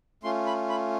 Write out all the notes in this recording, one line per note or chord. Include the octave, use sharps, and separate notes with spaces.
A3 C#4 F4 C6
B5
B5